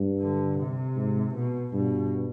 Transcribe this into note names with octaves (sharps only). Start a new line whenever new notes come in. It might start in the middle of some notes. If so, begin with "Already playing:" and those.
Already playing: G2
D3
C3
G#2
B2
G2 B2